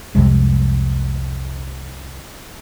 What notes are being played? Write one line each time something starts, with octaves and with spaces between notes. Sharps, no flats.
C2 F2 C3 G#3